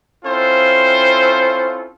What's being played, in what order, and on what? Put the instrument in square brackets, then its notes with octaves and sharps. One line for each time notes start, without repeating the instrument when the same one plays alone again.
[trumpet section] C4 C#4 E4 F4 A4 C5